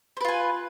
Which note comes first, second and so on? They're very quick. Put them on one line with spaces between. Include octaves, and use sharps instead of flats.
C5 B4 F4 G#5